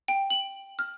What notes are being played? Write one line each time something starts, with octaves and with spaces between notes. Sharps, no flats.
G5
F#7
F6